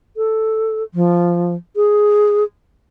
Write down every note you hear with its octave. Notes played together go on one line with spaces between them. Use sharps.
A4
F3
G#4